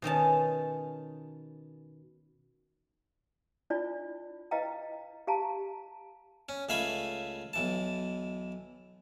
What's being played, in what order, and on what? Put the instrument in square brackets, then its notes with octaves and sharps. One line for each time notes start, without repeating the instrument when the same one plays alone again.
[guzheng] B2 D#3 C#4 A5
[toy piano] D4 E4 F4 D5
E4 B4 D#5 F5 G5 A#5
G4 F5 A5 A#5
[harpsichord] C#4
C#2 A3 E5 F5 G#5 B5
B1 E3 A5